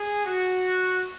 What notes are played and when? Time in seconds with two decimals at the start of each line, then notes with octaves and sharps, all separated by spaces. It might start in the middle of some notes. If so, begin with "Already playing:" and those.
Already playing: G#4
0.26 F#4